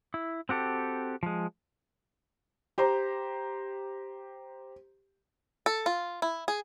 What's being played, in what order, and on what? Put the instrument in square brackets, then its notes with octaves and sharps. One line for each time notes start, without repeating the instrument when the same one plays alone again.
[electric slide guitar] E4
C4 F#4 G4 A4
F3 G#3
[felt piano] G4 C5 A#5 C6
[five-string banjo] A4
F4
E4
G#4